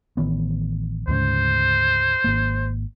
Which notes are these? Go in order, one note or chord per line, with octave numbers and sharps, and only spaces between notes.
A1 D#3 B3
D2 G#2 C#3 C5
G#1 A#3